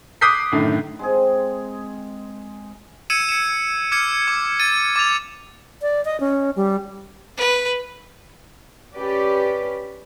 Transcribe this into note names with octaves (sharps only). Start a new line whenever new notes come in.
D6 D#6 F#6 G6 B6 C7
F#2 A2 D3 D#3
G#3 C4 G#4
E6 G#6 C#7 D#7 E7
C#7 E7
D6 F6 G#6 C#7
D6
A6 D#7
D6 A6 F7
D5
D#5
C#4
G3
B4
C#4 G4 B4 D5